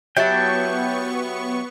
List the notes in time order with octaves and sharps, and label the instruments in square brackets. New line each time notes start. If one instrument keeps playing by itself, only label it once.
[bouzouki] F#3 E4 G4 [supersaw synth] B3 C#6 [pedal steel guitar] G5 A5